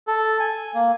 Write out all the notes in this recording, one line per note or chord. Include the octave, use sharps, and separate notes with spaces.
A4
G#5
A#3